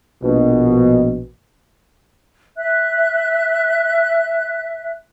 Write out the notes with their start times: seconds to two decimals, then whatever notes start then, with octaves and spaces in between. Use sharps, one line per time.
0.23 A#1 B2
2.57 E5 F#6